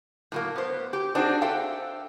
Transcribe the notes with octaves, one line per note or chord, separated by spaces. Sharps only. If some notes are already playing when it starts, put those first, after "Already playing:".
A2 F#3 A#3
B3 C5
G4
C4 D4 D#4 F#4 G#4 C5
A4 C5 E5 F5 G5